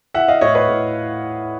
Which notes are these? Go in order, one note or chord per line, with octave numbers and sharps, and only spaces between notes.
E3 E5 F#5
D#5 F5
A2 C#5 D#5
B4 C#5
A2